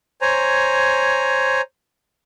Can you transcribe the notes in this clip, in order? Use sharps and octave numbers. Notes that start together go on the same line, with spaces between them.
C5 C#5 G#5 A#5